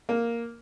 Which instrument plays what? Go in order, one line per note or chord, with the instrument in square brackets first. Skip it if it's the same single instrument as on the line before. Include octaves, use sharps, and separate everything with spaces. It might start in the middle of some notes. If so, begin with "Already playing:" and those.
[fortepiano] A#3